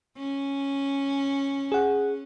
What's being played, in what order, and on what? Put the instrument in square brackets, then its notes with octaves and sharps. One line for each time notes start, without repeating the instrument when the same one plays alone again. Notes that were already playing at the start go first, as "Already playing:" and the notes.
[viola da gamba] C#4
[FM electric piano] G#4 F#5